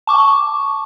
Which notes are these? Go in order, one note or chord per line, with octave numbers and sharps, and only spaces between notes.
A5 C#6 D6